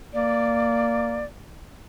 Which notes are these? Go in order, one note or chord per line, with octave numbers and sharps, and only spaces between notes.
A#3 D5